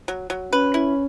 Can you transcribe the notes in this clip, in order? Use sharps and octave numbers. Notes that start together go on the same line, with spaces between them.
F#3
F#3
C#4 B4
E4